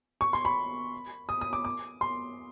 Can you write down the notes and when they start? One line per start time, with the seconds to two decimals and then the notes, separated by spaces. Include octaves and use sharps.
0.21 C#6
0.33 C6
0.45 B5
1.29 D#6
1.41 D#6
1.53 D6
1.65 D6
2.01 C6